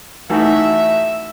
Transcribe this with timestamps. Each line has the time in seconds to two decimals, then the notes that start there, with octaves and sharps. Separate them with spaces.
0.30 E3 A3 D#4 F#4 A4 E5